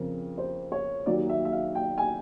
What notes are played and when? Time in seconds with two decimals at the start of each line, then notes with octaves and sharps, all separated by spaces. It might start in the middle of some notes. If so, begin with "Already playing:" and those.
Already playing: F2 C#3 F3 A#4
0.38 C5
0.72 C#5
1.06 D#2 D#3 F#3 A#3 D5
1.29 E5
1.45 E5
1.52 F5
1.75 G5
1.98 G#5